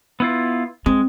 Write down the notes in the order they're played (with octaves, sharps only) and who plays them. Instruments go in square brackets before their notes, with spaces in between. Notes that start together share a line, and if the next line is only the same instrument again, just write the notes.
[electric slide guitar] B3 E4 F4
[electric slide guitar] G#3 [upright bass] C4